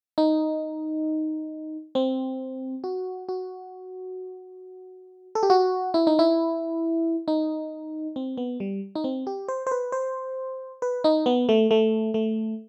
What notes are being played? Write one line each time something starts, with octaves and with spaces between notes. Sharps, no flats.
D#4
C4
F#4
F#4
A4
G4
F#4
E4
D#4
E4
D#4
C4
B3
G3
D#4
C4
G4
C5
C5
B4
C5
B4
D#4
B3
A3
A3
A3